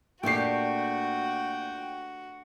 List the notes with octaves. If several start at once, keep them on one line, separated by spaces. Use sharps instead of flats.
A#2 A3 D4 F#4 G4 G5 C7